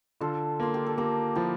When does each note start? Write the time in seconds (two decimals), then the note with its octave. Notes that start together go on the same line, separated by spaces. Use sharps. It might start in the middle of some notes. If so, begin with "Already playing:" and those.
0.21 D3 F4 A4
0.60 A#3 F4
0.74 G4
0.86 A4
0.98 A#3 G4 A#4
1.35 F3 E4 G4